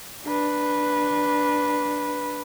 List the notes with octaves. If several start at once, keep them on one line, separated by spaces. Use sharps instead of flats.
D4 B4